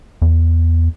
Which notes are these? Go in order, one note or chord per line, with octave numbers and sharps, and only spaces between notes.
E2